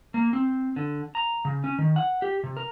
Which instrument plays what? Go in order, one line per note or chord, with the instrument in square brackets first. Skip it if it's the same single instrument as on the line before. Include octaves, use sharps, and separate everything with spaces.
[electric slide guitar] A#3
C4
D3
A#5
C#3
C#4
D#3
F#5
G4
C3
A#4